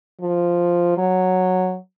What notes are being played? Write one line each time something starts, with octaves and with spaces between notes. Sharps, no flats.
F3
F#3